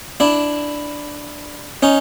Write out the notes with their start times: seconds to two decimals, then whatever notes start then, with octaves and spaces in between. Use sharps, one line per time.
0.20 D4 E4
1.83 C#4 D#4